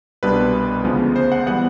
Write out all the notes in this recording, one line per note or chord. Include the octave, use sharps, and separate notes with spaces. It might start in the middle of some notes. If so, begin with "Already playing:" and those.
C2 B2 G3 B3 D4 B4
D2 C#3 F3 G#3 B3
C5
F#5
E3 G3 B3 F#5